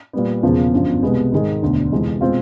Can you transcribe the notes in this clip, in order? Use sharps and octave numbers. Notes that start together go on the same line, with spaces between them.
A#2 G3 B3
E1 E2 C#3 F3 A#3
G1 F#2 D3 F3
C2 B2 G#3 B3
G#2 D#3 G#3
E1 D2 D3
F2 C3 E3 G#3
B2 G#3 C4 F4